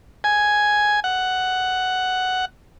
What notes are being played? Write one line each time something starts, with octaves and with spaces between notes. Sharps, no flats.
G#5
F#5